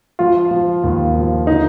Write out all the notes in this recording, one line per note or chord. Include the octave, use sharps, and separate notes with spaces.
F3 F4
F3
D#2
F3
D3 D#4